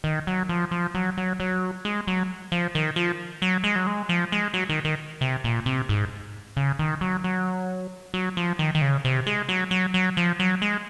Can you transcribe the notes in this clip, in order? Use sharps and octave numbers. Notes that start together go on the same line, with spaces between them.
D#3
F#3
F3
F3
F#3
F#3
F#3
G#3
F#3
F3
D#3
F3
F#3
G#3
F#3
G#3
F3
G#3
F#3
D#3
D#3
C3
A#2
C3
G#2
C#3
D#3
F#3
F#3
F#3
F3
D#3
D#3
C#3
C3
G#3
F#3
F#3
F#3
F3
F#3
G#3